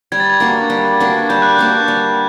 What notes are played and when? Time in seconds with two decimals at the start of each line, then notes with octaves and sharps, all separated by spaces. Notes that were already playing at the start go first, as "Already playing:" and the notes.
0.12 G3 G#6
0.20 A6
0.30 G#6
0.40 A#3 D4 F#4
0.70 G3
1.00 A#3 D4 F#4
1.29 G3 G6
1.42 F#6
1.56 A#3 D4 F#4 G6
1.88 G3